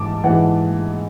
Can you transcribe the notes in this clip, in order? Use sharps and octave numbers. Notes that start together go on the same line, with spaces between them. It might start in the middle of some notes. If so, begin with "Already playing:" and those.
Already playing: G#2 E3 A5 D6
E3 F#5
G#2